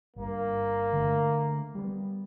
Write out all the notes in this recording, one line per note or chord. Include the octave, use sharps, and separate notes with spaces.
G1 G2 A#3
D3 A3
G3 B3